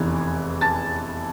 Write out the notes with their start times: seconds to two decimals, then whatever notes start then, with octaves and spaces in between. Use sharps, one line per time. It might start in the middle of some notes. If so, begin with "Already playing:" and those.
Already playing: F1 E2 E3
0.61 A5 A6